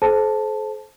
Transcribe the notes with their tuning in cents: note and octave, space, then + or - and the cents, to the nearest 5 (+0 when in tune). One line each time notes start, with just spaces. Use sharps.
A4 -45 C5 +0 A5 +0